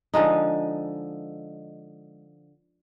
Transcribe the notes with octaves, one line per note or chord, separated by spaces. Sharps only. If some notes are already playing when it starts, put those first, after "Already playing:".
D3 F3 G#3 D#4